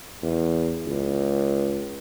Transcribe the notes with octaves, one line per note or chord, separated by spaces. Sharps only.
E2
C#2